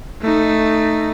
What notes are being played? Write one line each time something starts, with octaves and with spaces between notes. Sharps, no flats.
A3 D#4